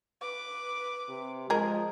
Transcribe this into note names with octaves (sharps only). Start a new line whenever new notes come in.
B4 D6
C3
F3 G#3 G#4 A#4